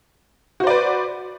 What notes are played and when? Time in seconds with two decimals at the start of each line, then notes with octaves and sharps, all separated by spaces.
0.60 F#4
0.64 C5
0.67 D5
0.70 B4